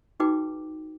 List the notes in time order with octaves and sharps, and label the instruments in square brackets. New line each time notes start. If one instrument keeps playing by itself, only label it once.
[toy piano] D#4 F#4 G#4 B4 G5 D6